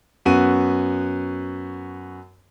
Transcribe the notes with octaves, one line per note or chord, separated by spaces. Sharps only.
F#2 B3 F#4 D#7